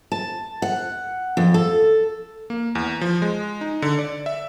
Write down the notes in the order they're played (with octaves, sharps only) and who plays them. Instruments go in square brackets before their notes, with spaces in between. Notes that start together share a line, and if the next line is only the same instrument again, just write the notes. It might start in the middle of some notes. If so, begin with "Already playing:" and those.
[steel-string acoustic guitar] A5
F#5
F2
A4
[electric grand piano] A#3
E2
F3
G#3
D#4
D3
D5
E5